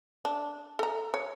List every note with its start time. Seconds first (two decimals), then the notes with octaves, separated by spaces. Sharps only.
0.25 D4
0.79 A4 A#5
1.14 C#5